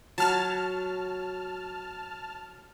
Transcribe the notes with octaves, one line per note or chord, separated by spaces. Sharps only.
F#3 F#4 A5 F6